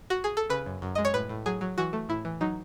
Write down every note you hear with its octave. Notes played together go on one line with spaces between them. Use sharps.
F#4
G#4
A4
C#3 B4
F#2
F#2
G#3 D#5
C#5
A2 B4
A2
F#3 G#4
F#3
E3 F#4
A3
A2 E4
E3
F#3 D#4